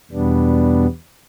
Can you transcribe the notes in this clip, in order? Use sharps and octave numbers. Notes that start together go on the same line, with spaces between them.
E2 B2 G3 B3 D4